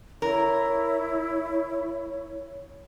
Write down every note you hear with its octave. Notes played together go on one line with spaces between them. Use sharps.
E4 A#4 C#5